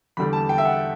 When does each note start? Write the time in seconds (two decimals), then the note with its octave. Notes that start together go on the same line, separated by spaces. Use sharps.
0.17 E2 D3 G3 B5
0.33 A5
0.49 G5
0.58 E5
0.65 F#5